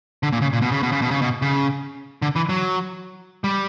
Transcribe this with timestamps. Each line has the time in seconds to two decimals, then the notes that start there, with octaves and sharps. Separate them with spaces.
0.23 D3
0.33 A#2
0.42 C#3
0.53 A#2
0.62 B2
0.72 C#3
0.83 B2
0.92 C#3
1.02 B2
1.11 C#3
1.22 B2
1.42 C#3
2.22 D3
2.36 E3
2.49 F#3
3.44 G3